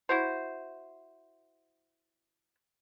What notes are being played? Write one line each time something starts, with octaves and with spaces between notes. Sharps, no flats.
E4 F#4 C5